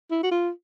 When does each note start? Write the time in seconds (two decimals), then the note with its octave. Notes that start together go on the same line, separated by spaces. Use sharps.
0.11 E4
0.23 F#4
0.31 F4